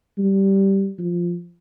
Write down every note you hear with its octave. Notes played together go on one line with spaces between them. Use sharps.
G3
F3